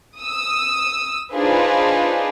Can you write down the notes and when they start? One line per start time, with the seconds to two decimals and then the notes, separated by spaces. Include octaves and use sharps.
0.18 D#6 E6
1.33 D4 D#4 F4 G#4 B4 C5